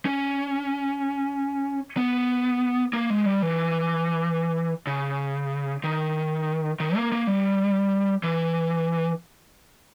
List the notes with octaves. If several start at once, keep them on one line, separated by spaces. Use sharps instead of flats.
C#4
B3
A#3
G#3
G3
E3
C#3
D#3
D#3
A#3
A#3
G3
E3